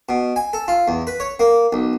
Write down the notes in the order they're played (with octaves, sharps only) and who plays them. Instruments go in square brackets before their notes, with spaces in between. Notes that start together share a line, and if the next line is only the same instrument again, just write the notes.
[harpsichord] B2
G#5
A4
F4
E2
B4
C#5
A#3
B1